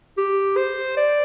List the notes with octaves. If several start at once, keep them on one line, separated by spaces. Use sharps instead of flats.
G4
C5
D5